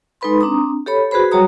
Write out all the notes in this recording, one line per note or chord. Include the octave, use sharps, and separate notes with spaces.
G#3 D#4 A4 B4 B5 C6
C4 D4 A#5 D#6
G4 A4 C#5 B5
F#4 G#4 B4 C5 B5
F#3 G3 F#4 C#5 A#5 D#6